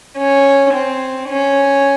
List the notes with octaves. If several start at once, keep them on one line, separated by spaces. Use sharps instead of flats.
C#4
C4
C#4